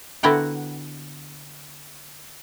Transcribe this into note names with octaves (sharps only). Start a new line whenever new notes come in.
D3 B3 E4 F#4 G5 A#5